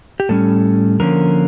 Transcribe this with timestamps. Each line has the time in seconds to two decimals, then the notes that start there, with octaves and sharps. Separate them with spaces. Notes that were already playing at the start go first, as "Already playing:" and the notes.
0.20 G4
0.29 A2 G3 C#4 A4
1.00 D3 F3 A#3 C#4 A#4